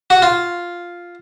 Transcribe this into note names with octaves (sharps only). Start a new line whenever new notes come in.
F#4
F4